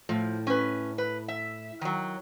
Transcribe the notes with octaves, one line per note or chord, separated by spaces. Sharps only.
A2 F3
C#4 B4
B4
E5
D#3 F#3